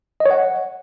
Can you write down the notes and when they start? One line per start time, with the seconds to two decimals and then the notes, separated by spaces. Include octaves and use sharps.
0.20 D#5
0.26 C#5
0.31 F#5